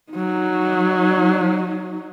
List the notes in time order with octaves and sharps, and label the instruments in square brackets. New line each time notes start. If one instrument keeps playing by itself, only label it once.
[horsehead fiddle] F#3 D#4